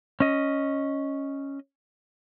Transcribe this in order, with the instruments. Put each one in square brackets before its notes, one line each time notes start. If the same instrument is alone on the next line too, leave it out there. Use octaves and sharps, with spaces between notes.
[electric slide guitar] C#4 D#5